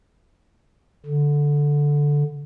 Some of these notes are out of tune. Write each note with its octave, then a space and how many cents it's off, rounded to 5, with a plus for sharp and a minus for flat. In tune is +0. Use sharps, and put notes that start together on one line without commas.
D3 -5